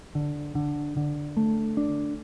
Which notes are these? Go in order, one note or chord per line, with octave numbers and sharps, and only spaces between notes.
D3
D3
D3
A3
D4